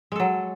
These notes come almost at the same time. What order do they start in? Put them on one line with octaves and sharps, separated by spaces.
G#3 A4 F#3